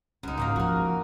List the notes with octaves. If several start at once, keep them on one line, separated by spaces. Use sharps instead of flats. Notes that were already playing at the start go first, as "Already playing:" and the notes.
C#2 F#2 D#4
G#2 A#3 F5 A#5
F3 F#4 A#4